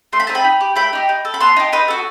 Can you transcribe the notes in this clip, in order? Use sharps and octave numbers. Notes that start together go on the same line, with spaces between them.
A3 C6
B5
C4 D#4 A5
G5 B5
D#4
G4
A3 G5 B5
D#4 G4
D#4
A4
B5
B3 A5 C6
D#4 G4
D#4 B4 D#5
F#4 A4